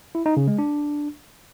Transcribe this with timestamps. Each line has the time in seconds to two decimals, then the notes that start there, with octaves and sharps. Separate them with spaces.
0.15 E4
0.26 D#4
0.37 C#3
0.48 G#3
0.58 D4